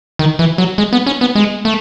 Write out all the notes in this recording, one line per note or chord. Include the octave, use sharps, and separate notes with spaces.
D#3
E3
F#3
G#3
B3
C#4
B3
G#3
A3